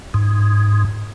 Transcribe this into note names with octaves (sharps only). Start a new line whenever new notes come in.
G#2